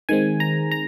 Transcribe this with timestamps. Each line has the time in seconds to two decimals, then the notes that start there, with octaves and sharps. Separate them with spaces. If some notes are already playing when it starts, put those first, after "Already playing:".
0.09 D#3 G#3 C4 G#5
0.40 A#5
0.71 A#5